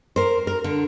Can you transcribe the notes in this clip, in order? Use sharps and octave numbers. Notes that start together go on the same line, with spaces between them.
A#4 C5
A#4
D3